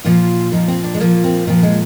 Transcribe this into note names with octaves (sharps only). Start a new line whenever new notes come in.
A#2 F3 F4
A#2 F3 D#4
C4
D4
G#3
A#2 F3 A#3
C4
A#2 F3 C4
G#3